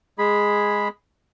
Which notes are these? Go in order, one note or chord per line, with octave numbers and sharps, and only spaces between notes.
G#3 G#4 B5